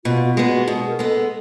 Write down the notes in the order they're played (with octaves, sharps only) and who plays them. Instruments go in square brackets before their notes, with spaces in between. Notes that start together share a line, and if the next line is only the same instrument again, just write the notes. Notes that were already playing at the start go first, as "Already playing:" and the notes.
[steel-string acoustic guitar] B2 [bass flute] F4
[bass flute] F4
[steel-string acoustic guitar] G#3 B3 [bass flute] F4
[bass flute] F#4
[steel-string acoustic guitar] B2 [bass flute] G#4
[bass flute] A#4
[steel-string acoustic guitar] G#3 B3 [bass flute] A4